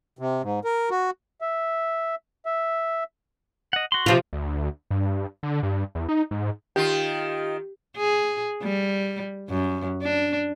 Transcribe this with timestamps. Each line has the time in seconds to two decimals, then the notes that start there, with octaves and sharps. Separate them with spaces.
0.19 C3
0.43 G#2
0.64 A#4
0.90 F#4
1.41 E5
2.46 E5
3.73 D#5 F#5
3.92 F#4 C6
4.06 C3 F3 F4
4.33 D2
4.91 G2
5.43 D3
5.63 G2
5.95 E2
6.09 D#4
6.31 G#2
6.76 D#3 F4 G4
7.97 G#4
8.63 G3
9.50 F#2
10.02 D4